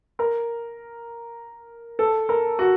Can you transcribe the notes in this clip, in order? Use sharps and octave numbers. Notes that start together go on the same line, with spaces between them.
A#4
A4
A#4
F#4